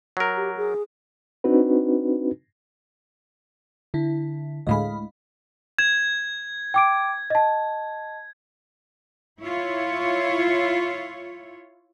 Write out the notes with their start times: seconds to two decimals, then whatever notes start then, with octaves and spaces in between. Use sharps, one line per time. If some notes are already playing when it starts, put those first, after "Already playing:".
0.17 F#3 A#4
0.36 G4
0.57 G#4
1.44 C4 D4 D#4 F#4 B4
3.94 D3 E4
4.67 D2 A2 G#3 D#5 F5 B5
5.79 G#6 E7
6.74 G5 D6 D7
7.30 D#5 A5
9.41 E4 F4 C#5